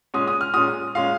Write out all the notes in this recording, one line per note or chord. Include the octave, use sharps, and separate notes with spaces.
A#2 G#3 C#4 D#6
D#6
F6
A#2 G#3 C#4 D#6
A#2 G#3 C#4 F5